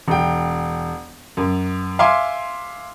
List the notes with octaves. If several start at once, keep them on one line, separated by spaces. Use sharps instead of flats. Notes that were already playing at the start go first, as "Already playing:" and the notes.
E1 G5
F#2
E5 F5 G#5 C6 D6